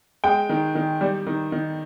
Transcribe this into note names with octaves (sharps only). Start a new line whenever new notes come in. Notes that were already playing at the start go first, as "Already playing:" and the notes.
G#3 G5
D#3
D#3
G3
D#3
D#3